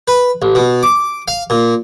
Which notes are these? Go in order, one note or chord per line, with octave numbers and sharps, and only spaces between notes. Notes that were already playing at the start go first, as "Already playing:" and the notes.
B4
A1
B2
D6
F5
A#2